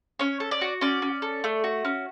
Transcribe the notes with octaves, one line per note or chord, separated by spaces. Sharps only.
C#4 C#5
A4
D5
F#4
C#4 D5
C#4
A4
A3
F#4
C#4